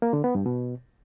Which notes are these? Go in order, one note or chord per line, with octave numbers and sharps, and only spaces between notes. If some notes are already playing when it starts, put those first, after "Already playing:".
A#3
D3
B3
G2
B2